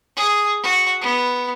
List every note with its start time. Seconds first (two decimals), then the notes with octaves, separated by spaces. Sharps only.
0.17 G#4
0.63 F#4
1.01 B3